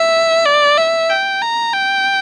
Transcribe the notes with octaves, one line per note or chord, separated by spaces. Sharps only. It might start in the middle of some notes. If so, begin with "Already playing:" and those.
Already playing: E5
D5
E5
G5
A#5
G5